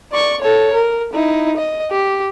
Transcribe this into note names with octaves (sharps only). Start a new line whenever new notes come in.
D5 C#6
A4 C#5
A#4
D#4 E4
D#5
G4